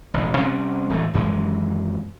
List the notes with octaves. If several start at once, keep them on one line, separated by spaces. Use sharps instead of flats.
E1 A1
C3 G3 C4 C#4
D1 E3 A3
D#1 F#2 E3 G#3